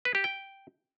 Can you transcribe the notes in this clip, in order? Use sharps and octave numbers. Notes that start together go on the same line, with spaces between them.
B4
G4
G5